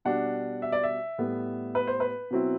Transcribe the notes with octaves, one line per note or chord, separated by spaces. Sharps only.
B2 G3 D4 F#5
E5
D5
E5
A2 G3 B3
B4
C5
B4
B2 F#3 C4 E4